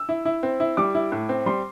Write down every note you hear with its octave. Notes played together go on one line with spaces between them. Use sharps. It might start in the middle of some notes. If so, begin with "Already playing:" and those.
Already playing: E6
E4
E4
C4
E4
G3 D6
E4
A2
C4
G3 C6